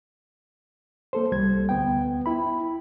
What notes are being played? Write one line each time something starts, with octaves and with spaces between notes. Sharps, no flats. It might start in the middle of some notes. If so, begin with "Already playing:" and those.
A#3 A4 C5
C2 G3 G#6
D2 B3 G5
E4 B5